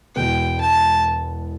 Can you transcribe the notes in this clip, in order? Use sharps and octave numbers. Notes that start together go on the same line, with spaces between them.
E1 E2 B2 G#3 B3 G5
A5